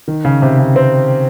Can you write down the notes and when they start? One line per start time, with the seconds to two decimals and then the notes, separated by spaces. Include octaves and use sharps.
0.08 D#3
0.25 C#3
0.42 C3
0.59 C#3
0.76 C4